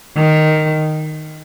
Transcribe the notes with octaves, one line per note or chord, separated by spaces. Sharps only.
D#3